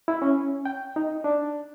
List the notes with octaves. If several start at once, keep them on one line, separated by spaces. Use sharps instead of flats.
E4
C#4
G5
D#4
D4